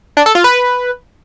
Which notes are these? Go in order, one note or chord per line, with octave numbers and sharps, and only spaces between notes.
D4
A4
F4
B4